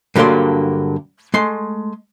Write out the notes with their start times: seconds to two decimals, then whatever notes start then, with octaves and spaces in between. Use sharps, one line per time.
0.16 G2 D3 F#3 A#3 D5 C6
1.34 G#3 A3 C6